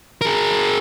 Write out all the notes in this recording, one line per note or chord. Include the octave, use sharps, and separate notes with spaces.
G#4 A#4